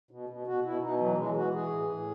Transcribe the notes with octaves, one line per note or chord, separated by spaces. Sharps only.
B2
B2
B2 F#4
B2 E4
B2 D#4
E3 F#3
E3 G#3
E3 F#4
E3 G#4
A2
A2